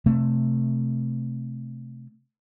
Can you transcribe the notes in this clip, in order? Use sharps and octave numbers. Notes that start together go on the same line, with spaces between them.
C3 A3 C4